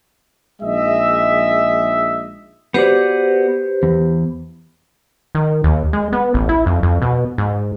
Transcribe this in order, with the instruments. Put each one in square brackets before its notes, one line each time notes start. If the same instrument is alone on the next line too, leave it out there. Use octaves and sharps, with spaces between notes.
[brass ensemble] A#1 G#3 D#4 D#5 E5
[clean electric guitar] B3 F#4 D5 [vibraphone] G4 B4 C5
[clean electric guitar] E2
[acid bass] D#3
D#2
G#3
B3
A1
E4
F2
F2
B2
G#2